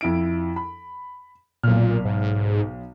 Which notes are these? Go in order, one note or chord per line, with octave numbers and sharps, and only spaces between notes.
F2 E4 D7
B5
B1 A#2 F6
G#2